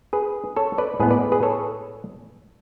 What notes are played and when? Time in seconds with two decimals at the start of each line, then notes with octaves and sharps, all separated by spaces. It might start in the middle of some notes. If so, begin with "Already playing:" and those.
0.13 G#4 B4
0.56 A4 C#5
0.78 B4 D5
1.00 A2 G#3 B3 G#4 B4
1.11 B4 D5
1.32 G#4 B4
1.43 A4 C#5